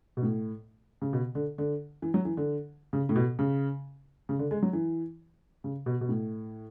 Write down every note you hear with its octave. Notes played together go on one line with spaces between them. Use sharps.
B2
A2
C#3
B2
D3
D3
E3
F#3
E3
D3
C#3
A2
B2
C#3
C#3
D3
G#3
F#3
E3
C#3
B2
B2
A2